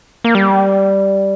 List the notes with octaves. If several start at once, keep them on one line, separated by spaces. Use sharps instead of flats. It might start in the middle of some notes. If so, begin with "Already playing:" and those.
A#3
G3